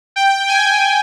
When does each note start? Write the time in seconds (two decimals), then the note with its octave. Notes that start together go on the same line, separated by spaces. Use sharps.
0.16 G5
0.48 G#5